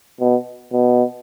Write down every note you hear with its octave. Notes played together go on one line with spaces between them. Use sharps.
B2
B2